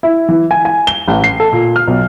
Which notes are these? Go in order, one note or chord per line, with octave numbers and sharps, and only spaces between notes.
E4
E3
G#5
G#5
G7
A1
C7
A4
A#2
F6
B1